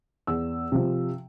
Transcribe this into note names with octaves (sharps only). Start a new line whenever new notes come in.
E2 E6
C3 F3